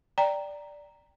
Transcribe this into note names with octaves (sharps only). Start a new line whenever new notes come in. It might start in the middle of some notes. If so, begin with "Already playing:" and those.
D5 G5 A#5